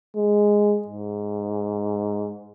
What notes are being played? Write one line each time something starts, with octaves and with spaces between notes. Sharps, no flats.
G#3
G#2